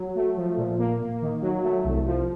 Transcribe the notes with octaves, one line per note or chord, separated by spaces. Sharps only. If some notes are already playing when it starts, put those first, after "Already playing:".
Already playing: F#3
A3
F3
A#2
A#3
A#3
D#3
F#3
A3
C2
F3